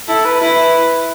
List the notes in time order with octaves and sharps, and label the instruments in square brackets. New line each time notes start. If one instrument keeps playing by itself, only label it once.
[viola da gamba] E4 [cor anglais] A4
[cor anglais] B4
[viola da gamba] E4 [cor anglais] B4